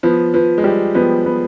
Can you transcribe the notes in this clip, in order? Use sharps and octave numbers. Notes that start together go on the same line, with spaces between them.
F3 B3
F3 B4
G#3
G3 G4
F3 B3
B3